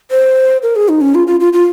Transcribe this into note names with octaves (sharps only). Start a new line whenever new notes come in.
C5
A#4
G#4
D#4
C#4
F4
F4
F4
F4